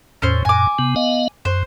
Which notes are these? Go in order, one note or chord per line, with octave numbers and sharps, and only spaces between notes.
E2 A2 C#4 C5
F#2 A#2 G#5 D6
C3 B3
B3 D#5 F5
F#2 C5